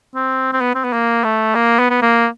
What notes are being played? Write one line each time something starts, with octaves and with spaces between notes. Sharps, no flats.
C4
C4
B3
C4
B3
A#3
A3
A#3
B3
B3
A#3